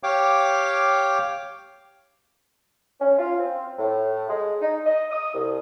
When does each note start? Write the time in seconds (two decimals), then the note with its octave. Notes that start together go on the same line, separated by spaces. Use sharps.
0.03 G4 C#5 F5 G5 D6
3.01 C#4
3.19 F4
3.39 C4
3.78 A2
4.29 G#3
4.61 D#4
4.86 D#5
5.11 D#6
5.34 C2